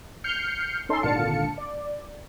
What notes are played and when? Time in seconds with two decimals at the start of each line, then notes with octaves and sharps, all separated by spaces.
0.24 F6 G6 C7 C#7
0.89 C#4 D#4 A4 C6
1.03 G#1 A#2 D3 F5 A5 C#7
1.58 D5